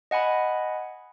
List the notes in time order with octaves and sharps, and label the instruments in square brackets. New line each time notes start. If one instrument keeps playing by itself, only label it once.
[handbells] D#5 F#5 G#5 B5